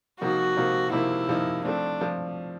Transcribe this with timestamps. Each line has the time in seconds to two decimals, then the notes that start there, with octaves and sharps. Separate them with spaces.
0.20 C3 F3 A#3 D#4 F#4
0.56 C3 F3 A#3 D#4
0.92 C3 F3 A#3 D#4 E4
1.28 C3 F3 A#3 D#4
1.65 F3 A3 C4 D4
2.01 F3